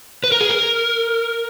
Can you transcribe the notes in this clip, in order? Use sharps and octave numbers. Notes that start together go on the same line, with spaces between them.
B4
A#4
G#4
A#4